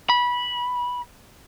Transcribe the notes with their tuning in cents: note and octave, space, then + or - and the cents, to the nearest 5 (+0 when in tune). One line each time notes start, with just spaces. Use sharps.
B5 -15